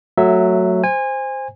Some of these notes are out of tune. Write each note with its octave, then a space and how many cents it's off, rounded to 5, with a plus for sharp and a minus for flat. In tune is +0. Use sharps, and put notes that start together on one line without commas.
F#3 +0 A3 +20 E5 +0
C5 +0 G#5 -25